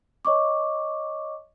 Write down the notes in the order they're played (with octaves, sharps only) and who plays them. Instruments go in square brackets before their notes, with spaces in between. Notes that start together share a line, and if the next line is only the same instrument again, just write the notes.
[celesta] C#5 D#5 C#6 D6